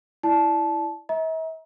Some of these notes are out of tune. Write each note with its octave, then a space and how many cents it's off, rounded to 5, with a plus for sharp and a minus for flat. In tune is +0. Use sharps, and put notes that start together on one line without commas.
E4 +0 D5 +0 A5 -20
E5 -45 A#5 +30